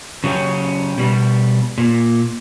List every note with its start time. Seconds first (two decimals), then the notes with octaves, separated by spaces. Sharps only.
0.24 C#3 F#3 C#4 G4
0.98 B2 G3
1.78 A#2